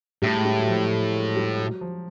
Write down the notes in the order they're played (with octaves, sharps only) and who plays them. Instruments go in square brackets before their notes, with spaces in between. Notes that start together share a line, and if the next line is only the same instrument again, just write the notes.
[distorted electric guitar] A2 [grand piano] G3
[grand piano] G#3
G3
F#3
F3
G#3
G3
F#3
F3